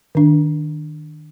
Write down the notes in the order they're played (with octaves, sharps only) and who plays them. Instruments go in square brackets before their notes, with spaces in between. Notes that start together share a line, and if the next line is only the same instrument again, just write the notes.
[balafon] D#3 D4